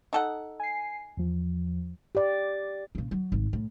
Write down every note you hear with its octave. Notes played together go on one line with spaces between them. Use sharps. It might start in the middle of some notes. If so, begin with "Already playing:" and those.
D#4 A4 F#5
G#5 C7
E2 F3
G4 D5
A#2 C#3
F#3
G#1 G#2
A2